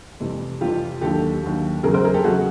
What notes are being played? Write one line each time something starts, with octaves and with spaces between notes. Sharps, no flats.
F2 C3 E3 G3
F2 C3 E3 G3 F4 G4
D#2 D3 F#3 G4 A4
D#2 D3 F#3
E2 C#3 F#3 G#4 A#4
A#4 C5
G#4 A#4
G4 A4
E2 C#3 F#3 F#4 G#4